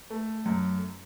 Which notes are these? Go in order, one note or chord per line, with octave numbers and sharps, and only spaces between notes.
A3
F#2